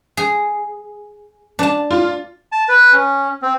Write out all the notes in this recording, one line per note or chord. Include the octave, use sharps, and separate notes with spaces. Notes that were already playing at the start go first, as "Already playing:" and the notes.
G#4
D4 A5
F4
A5
B4
C#4
C4